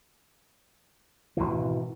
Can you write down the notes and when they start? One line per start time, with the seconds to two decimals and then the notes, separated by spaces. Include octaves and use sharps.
1.37 G#1 C#2 B2 E3